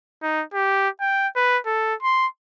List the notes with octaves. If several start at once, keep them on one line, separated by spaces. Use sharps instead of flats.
D#4
G4
G5
B4
A4
C6